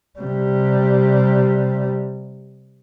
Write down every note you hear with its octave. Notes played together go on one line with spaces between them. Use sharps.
C3 G3